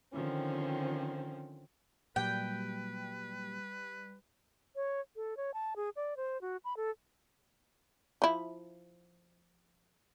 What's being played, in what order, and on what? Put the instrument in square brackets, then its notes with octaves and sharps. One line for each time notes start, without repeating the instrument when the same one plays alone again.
[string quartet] D3 D#3 F3 C4 C#4
[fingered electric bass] A#2 F#3 [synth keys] G3 [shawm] B4 [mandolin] G5
[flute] C#5
A4
C#5
A5
G#4
D5
C5
F#4
B5
A4
[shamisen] F3 E4